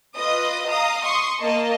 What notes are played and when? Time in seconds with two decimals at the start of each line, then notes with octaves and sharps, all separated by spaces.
0.16 F4 B4 D#5 D#6
0.68 D#5 F5 A#5 D#6
1.04 C6 C#6 D#6
1.39 A#3 D#5 A5